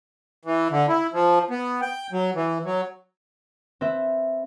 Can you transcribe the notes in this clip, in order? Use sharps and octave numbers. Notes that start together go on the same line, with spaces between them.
E3
D3
E4
F3
B3
G5
F#3
E3
F#3
C4 B4 E5